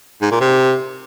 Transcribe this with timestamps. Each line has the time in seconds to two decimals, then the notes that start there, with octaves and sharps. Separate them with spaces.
0.22 G#2
0.31 A#2
0.41 C3